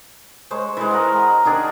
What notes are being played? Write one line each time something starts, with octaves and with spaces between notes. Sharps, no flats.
G#3 C5 C#5
E3 G#3
A#4 D#5 F#5
D#3 D4 G#4